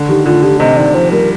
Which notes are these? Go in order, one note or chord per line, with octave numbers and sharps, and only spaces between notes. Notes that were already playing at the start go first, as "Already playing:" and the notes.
Already playing: D3
D#3 G4
D3 F4
D3 G4
C3 D#5
D#3 D5
F3 C5
G3 A#4